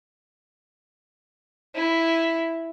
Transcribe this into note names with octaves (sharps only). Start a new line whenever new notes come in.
E4